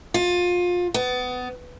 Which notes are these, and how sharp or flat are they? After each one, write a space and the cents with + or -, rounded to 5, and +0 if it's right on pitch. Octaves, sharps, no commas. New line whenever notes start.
F4 +25
B3 +20